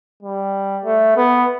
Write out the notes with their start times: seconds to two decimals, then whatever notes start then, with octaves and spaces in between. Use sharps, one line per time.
0.23 G3
0.85 A3
1.17 B3